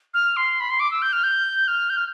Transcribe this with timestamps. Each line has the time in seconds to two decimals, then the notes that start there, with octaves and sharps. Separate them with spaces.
0.14 F6
0.37 C6
0.60 B5
0.70 C6
0.80 D6
0.91 E6
1.02 G6
1.13 F6
1.24 G6
1.68 F6
1.90 G6
1.97 F6